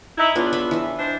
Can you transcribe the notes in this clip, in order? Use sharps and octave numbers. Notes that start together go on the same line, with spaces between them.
D#4 E4
E2 A2 B3 D4 F4
F4 E5 B5
E3 E5
D4 D#4 C5